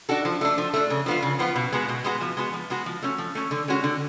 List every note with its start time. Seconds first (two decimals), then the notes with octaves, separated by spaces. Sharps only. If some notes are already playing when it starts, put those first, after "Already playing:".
0.09 D4 F#4 A4
0.25 F3
0.41 A3 D4
0.58 F3
0.74 A3 D4
0.90 C#3
1.06 F3 B3 F4
1.22 C#3
1.39 F3 B3 F4
1.56 B2
1.72 G#3 B3 F#4
1.89 B2
2.04 G#3 B3 F#4
2.21 F3
2.37 G#3 B3 F#4
2.54 F3
2.70 G#3 B3 F#4
2.86 F3
3.03 A3 C#4
3.18 F3
3.35 A3 C#4
3.51 D3
3.68 G#3 C#4 F#4
3.84 D3